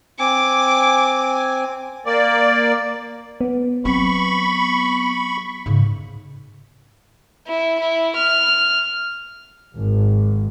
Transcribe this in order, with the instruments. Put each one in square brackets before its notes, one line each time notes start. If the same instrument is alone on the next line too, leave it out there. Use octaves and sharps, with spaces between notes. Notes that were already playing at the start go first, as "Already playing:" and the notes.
[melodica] C4 G#5 [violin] D6
[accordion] A#3 D5
[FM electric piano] B3
[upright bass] F#3 C4 [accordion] B5 C#6
[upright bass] G#2 C#3
[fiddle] E4
E4
F6
[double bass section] G#1